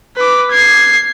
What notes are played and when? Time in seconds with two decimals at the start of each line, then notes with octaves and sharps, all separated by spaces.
0.17 B4 D6
0.52 G#6 C7